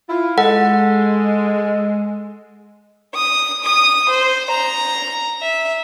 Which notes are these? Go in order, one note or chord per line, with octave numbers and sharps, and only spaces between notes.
E4 F4
G#3 A4 F#5
D#6
D#6
C5
A#5
E5